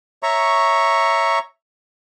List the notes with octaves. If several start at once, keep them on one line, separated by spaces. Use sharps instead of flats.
C#5 E5 A#5 C#6